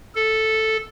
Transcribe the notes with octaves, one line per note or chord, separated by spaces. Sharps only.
A4